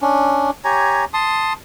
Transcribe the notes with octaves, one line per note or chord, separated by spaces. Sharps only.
C#4 D4
G4 C#5 G#5 A#5
A5 C6 D#6